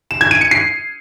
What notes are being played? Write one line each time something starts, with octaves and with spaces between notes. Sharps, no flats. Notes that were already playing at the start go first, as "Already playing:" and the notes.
E7
G#6
D#7
C#7
C7